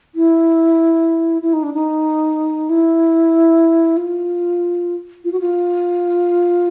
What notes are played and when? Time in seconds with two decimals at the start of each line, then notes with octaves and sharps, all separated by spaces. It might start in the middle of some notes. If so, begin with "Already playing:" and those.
0.15 E4
1.42 E4
1.53 D#4
1.63 D4
1.74 D#4
2.69 E4
3.97 F4
5.24 F4
5.32 F#4
5.40 F4